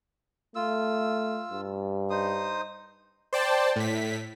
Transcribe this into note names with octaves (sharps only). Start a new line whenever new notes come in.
A3 F4 E6
G2
D#4 C5 D#6
C5 D5 G5 A5
A2 B6